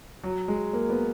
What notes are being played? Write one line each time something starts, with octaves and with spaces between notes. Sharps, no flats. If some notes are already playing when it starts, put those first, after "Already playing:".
F#3
G#3
A#3
B3